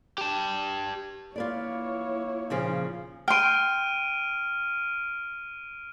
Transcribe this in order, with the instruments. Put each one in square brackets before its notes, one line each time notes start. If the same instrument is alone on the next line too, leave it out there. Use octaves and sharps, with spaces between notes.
[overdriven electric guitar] G4 A5
[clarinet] A#3 [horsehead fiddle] E4 C#5 [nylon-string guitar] F4 B4 D5
[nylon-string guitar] A#2 C#3 F3
[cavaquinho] G5 C6 [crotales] F6 D7 D#7